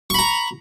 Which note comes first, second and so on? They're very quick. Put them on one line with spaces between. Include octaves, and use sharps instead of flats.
C#6 B5 A#5